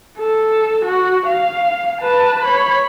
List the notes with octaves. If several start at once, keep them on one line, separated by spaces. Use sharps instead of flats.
A4
F#4
F5
B4 A5
C#5 B5